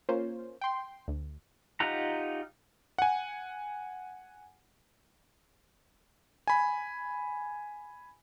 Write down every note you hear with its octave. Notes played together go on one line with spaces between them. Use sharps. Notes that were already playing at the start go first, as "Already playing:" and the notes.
A#3 C#4 F4 C5
G5 C6
D2
D#4 F4 G4 F#5 A#5
F#5 G#5
G#5 B5